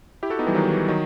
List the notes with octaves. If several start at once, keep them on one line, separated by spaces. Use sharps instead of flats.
E4 G4
F#4 A4
B3 D#4
E3 G3
D#3 F#3
E3
D#3 F#3